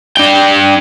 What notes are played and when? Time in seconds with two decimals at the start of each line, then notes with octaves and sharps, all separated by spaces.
0.17 D4 G5